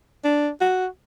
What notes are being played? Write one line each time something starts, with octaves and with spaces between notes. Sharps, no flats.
D4
F#4